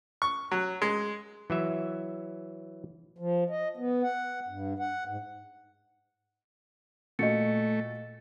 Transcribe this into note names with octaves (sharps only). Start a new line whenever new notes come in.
C#6
F#3
G#3
E3 F#3 E5
F3
D#5
B3
F#5
G2
F#5
G#2
A#2 A3 F#4 D#5 C#7